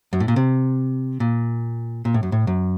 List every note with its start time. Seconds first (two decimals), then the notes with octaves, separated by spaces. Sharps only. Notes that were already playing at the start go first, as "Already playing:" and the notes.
0.13 F#2
0.20 A2
0.28 A#2
0.36 C3
1.20 A#2
2.05 A#2
2.14 A2
2.23 F#2
2.32 A2
2.47 F#2